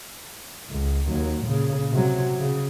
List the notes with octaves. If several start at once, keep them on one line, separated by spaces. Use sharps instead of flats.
C#2
D#2 F#3
A#2 C#3
C3 F#3
C#3